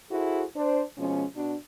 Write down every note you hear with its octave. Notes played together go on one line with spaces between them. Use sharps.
E4 F#4 G#4 A4 C5
D4 C5
B2 F3 G#3 C#4
B2 D4